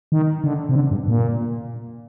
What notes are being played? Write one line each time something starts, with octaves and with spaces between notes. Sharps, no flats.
D#3
D3
C3
D3
G2
A#2